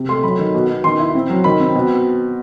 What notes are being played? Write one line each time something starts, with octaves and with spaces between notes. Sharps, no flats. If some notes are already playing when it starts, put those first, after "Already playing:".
Already playing: C3
A3 C6
F#3 B5
D#3
B2
B2
D#3 C6
E4
C4
F#3
D#3 B5
C4
B2